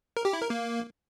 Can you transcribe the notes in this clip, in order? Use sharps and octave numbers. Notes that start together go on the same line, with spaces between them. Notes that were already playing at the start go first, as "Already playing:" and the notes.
A#4
G4
E4
A#4
A#3